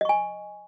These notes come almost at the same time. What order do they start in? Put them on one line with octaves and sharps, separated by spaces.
D#5 C#6 G#5